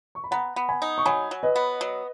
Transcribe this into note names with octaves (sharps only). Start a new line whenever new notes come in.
C#6
B5
B3 F#5 A#5
B3
G#5 B5
D#4
C#6
F#3 G#5 B5
F#3
B4 D#5
B3
F#3